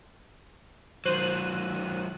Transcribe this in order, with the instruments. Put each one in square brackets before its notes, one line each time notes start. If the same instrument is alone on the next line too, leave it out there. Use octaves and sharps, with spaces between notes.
[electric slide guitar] D#3 F#3 [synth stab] C5 F#6 D#7